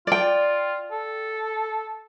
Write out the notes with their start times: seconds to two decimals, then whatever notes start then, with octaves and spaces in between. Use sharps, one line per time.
0.07 F4 D5 G5
0.91 A4